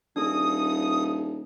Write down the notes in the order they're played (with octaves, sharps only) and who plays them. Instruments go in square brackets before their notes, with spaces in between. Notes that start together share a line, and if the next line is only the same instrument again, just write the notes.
[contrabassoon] D#1 [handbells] D4 G#4 [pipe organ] D#6